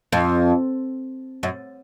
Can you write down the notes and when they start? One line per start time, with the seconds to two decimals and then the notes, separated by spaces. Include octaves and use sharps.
0.12 F2
1.43 F#2